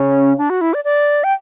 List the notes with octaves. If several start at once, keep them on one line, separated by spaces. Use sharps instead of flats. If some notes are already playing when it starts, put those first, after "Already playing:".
Already playing: C#3 C#4
D4
F#4
E4
D5
D5
G5